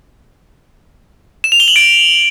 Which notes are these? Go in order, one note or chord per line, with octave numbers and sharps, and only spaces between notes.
E7
F7
G7
F#7
D7